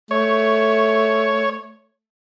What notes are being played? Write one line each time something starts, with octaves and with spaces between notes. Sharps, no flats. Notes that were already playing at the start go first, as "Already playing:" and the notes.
A3 C#5